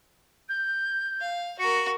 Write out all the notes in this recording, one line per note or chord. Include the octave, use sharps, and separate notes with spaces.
G6
F5
F#4 A#4 C#7